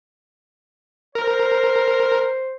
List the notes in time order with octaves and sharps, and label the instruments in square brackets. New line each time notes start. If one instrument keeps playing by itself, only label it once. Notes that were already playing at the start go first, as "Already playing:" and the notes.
[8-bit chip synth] A#4 [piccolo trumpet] C5